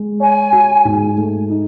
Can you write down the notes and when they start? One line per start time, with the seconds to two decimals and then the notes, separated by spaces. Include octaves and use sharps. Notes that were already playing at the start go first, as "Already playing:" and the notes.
Already playing: G#3
0.20 C#5 G#5
0.53 F#4
0.85 G#2
1.17 A3
1.50 D#4